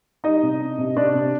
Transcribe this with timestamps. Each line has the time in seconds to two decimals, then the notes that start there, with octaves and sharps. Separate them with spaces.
0.24 G3 D#4 D#5
0.43 C3
0.60 D4
0.78 C3
0.96 C3 D4 D5
1.14 C3